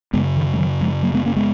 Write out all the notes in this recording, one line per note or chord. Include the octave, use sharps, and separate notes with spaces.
F#2 C#3 G#3 B3
D#3
G#3
D#3 F#3
F3 G#3
F#3 A#3
G#3 B3
A#3 C#4
G#3 B3